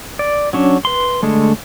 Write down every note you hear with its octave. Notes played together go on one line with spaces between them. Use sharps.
D5
F#3 C#4 D4
B4 C6
D3 G#3 A3